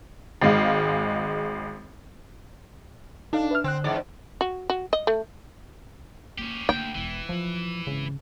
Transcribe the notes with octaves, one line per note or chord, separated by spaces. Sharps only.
G#1 G#3 F5
D4 D#4 A4 F5
B4 E5 F6
D3 C4 F#6
E2 G#2 D5
F#4
F#4
D#5
A3
A#3 C#4 F4 G4
D2 A#3 G5
E1 E3
F3 F#3
G#1 C#3